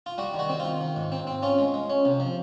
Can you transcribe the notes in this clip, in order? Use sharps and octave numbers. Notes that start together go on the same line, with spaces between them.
F4
G3 F#4
D#3
F#4
C4
F4
D#3
D#3
G#2
C4
C4
C#4 F4
G#3
G#3
C#4
C3
F3